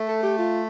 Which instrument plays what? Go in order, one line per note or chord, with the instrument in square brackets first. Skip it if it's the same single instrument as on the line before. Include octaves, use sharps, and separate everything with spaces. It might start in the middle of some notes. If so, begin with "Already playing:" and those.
Already playing: [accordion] A3
[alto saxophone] A4
G4
F4